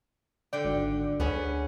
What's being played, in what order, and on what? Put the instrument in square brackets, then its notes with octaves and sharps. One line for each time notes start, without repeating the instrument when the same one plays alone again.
[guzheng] D3 G5 [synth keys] D5
[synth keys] G#1
[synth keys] D2 [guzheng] B3 C#4 G#4